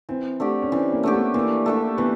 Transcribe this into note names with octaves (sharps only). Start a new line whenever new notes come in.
E3 C4
A3 D4 G4
C#4
E3 C4
A#3
A3 D4 G4
B3
E3 A#3
A3 D4 G4
E3 B3